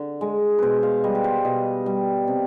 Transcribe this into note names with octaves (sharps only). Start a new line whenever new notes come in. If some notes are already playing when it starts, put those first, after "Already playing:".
Already playing: D3
G#3
B2 B4 C5
F5
G3 D#5
B4
C5
B2 D#5
G3
C3